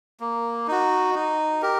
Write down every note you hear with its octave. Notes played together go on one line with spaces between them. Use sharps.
A#3
D#4 F#4
D#4
G4 A#4